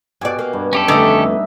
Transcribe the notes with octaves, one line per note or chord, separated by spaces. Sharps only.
G2 B2 G4 D5 G#5
A#3
G2
F#2 C#4 G4 A4
F2 D3 D#3 A3 D#4 D#5 E5